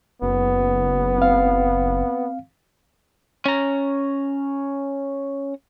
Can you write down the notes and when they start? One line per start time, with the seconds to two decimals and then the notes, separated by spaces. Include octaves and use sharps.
0.22 F#1 B3
1.18 C4 F5
3.46 C#4 A#5